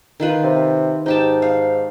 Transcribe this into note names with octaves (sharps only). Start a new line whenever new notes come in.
D#3 F4 B4
C3
G#2 D#4 G4 A5
F5